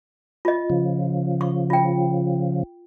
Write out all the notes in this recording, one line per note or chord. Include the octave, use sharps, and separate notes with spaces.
F4 D#5
C#3 F3
C#6
F4 G5